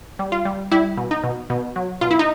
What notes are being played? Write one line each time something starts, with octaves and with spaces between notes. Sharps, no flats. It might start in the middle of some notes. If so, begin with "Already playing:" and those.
G3
F4
G3
G3 E4
B2
D#4
B2
B2
F#3
B2 F4
E4
D#4